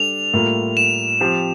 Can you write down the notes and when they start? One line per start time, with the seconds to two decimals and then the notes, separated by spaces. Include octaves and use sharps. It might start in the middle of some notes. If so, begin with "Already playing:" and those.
Already playing: G3 D4 A4 F7
0.34 A2 G3 A#3 F4
0.77 E7
1.20 F3 C4 G4 C5